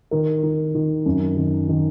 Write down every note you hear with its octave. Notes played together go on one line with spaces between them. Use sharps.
D#3 A#4
D#3
D#3
F#2
D#3
D#3